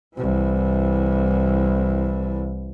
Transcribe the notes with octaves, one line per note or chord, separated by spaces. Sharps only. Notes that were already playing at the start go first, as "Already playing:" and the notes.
C2 E3